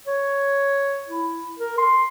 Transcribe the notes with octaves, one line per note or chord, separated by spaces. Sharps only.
C#5
E4
A#4
C6